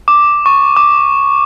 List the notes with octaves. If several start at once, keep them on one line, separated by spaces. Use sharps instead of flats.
D6
C#6
D6